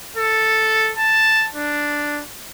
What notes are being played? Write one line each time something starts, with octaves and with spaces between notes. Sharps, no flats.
A4
A5
D4